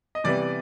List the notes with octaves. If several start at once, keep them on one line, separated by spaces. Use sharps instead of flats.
D#5
C3 E3 G3 B3 D5